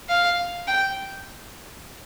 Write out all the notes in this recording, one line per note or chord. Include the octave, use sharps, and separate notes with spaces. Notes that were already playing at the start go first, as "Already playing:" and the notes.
F5
G5